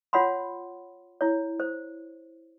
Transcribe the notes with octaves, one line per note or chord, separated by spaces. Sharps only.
F4 C#5 F#5 B5 C6
E4 C#5
C5